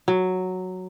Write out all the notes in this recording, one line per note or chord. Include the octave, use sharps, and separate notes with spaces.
F#3